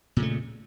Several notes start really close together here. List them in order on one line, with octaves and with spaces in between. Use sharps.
A#2 C#3 A3